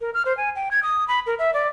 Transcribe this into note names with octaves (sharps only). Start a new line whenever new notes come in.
A#4
F6
C5
G#5
G5
G#6
D#6
B5
A#4
E5
D5